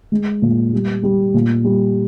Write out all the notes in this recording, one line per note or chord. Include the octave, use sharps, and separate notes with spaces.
G#3
A#2
G3
G3
A#2
G3